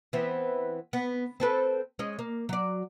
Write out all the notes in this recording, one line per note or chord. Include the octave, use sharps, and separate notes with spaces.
E3 B3 C4
B3
C4 A4 B4
G#3 C#4 D#5
A#3
F#3 D5